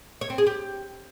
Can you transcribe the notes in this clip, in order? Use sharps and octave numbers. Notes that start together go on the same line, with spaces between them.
C#5
C4
G#4
G4